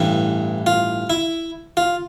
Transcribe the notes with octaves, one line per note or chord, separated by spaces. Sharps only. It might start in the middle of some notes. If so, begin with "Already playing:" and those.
Already playing: A1 G2 E3 E4
F4
E4
F4